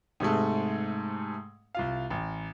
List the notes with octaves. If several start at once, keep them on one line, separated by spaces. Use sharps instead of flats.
G#2 C3 G#3 A3
C2 F4 F5
A1